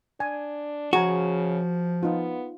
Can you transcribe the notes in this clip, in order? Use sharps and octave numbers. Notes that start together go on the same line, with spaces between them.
D4 G#5
C#3 F3 F#4 G#4 G#5 A#5
B3 D#4 F4